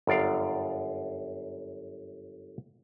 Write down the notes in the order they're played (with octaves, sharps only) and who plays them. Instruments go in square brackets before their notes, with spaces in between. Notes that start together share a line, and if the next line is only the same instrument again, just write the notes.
[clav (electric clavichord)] G1 F#2 D5 F5